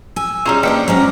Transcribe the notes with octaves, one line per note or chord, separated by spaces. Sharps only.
G#5 E6
G3 C#4 D#4 F4 G#4 C#5
F3 A#3 D4 B4 D#5 G5 A#5
F#3 G#3 C#4 C5 A#5